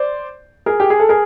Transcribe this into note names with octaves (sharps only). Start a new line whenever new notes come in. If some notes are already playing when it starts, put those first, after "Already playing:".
Already playing: C5 D5
G#4 A#4
G4
G#4
A4
G#4 A#4